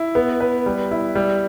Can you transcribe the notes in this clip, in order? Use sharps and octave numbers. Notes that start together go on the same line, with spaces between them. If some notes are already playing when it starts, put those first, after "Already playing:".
Already playing: E4
B3
B4
G3
E4
G3